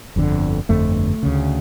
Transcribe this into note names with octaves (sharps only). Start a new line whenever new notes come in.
G1 F2 D3
G1 F2 D3 A3
D2 C#3